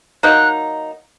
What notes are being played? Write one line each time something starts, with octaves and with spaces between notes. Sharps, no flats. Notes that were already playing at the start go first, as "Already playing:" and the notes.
F#3 A#3 D#4 F#6